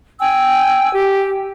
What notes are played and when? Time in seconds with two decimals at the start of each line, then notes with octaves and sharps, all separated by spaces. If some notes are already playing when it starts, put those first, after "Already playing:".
0.21 G5 G#5 E6
0.93 G4